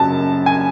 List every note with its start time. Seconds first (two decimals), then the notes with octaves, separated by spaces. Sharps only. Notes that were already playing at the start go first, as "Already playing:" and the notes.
Already playing: F#2 C#3 A5
0.46 G#5